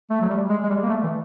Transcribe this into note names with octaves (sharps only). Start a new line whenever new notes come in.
A3
F#3
G3
G#3
G#3
G3
A#3
A3
E3